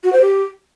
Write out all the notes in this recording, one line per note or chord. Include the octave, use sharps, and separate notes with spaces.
F#4
C5
G4